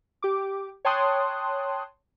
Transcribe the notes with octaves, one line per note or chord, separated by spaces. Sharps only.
G4 D6
C#5 G5 A5 C6 D#6 F#6